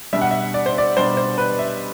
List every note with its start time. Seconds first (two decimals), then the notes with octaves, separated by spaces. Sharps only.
0.13 B2 G3 D4 E5
0.21 F#5
0.31 E5
0.54 D5
0.66 C5
0.78 D5
0.96 B2 G3 D4 C5
1.17 C5
1.38 B4
1.59 E5